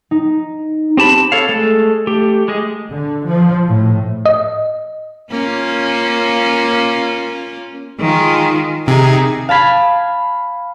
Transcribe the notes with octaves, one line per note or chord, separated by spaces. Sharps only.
D#4
C4 G4 A5 B5
A4 C#5 F5
G#3 A3 A4
A3 G4
G#3 G#4 D#5
D3
F3
A2
D#5
A#3 C#4 F4
D#3 G#3 F4
C3 D#3 D#4 G#4
F5 A5 B5 G#6 C7